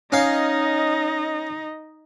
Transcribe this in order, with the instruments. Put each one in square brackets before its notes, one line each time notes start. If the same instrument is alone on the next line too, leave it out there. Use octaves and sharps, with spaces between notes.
[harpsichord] C#4 F5 [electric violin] D#4 D#5